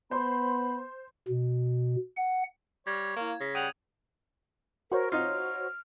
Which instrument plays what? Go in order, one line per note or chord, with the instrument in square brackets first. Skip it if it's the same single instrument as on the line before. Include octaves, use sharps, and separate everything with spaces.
[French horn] B3 [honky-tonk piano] C5 C6 [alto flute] B5
[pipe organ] B2
F#5
[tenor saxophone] G3 [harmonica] C#5 [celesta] F6 A#6 [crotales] G#6
[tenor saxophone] A#3 [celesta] E4 F5 E7
[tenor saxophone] C#3 [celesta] A#6 B6
[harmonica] G3 F#5 G5 [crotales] D#6 D#7 [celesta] D7 F7 F#7
[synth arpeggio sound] F#4 C5 C#5 [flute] A#4
[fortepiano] D#4 F4 [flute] F6